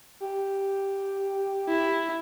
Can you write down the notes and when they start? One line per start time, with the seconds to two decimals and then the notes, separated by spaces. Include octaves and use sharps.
0.20 G4
1.69 E4